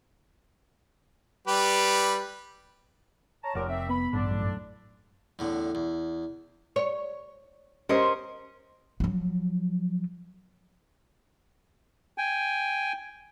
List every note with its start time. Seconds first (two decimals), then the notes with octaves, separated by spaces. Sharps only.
1.47 G3 G4 B4
3.43 C#5 A5 A#5
3.55 F1 D#2 A#2 A#4 C#5 F#5 D6
3.69 D#3 C4 E5
3.89 B3 B5
4.13 A1 G2 D3 D4
4.31 F#2 A2
5.39 E2 A2 D3
5.75 E2
6.76 C#5
7.89 C#4 G4 A#4 C5 D#5 C6
9.00 F3 F#3
12.18 G5 G#5